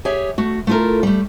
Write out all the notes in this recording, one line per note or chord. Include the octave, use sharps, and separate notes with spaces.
G4 G#4 C#5 E5
A3 F#4
A3 E4 F4 A4 A#4
G3 A3